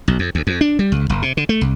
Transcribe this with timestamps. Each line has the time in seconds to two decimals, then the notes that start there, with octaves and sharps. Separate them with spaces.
0.08 B1
0.19 F2
0.35 D2
0.47 F2
0.61 D4
0.79 G3
0.92 C#2
1.10 F#1
1.22 C3
1.37 D3
1.49 A3
1.61 C2